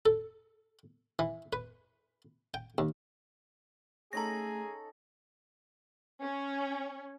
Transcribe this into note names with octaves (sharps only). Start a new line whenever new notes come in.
A4
E3
B4
G5
D#2
A3 C#4 D#4 G#4 A4 A#5 A#6
C#4